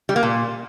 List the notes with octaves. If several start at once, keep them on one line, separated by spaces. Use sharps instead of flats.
G3
A#3
A#2